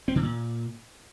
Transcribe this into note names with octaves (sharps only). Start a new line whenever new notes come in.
C4
D3
A#2